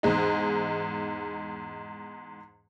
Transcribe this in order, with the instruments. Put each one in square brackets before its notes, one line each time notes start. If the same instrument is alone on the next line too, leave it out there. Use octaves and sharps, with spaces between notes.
[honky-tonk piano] E2 G#2 D#4